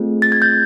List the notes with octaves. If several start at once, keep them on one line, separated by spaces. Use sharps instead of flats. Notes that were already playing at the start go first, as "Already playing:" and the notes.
Already playing: A3 C4 F4 G#4
A6
G#6
G6